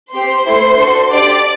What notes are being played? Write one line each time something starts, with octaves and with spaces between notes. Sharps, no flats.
C4 G4 C5 C6
A3 E4 A4
D4 F#4 A4
D4 G4 D5 D6